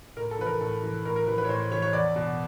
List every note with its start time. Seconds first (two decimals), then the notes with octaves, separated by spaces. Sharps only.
0.16 A2 A#4
0.31 A4
0.39 E3 B4
0.46 A#4
0.61 A2 A4
0.83 E3
1.05 A2 A#4
1.16 A#4
1.27 E3 B4
1.38 B4
1.45 C#5
1.49 A2 C5
1.72 E3 C#5
1.82 C#5
1.93 E2 D5
2.16 B2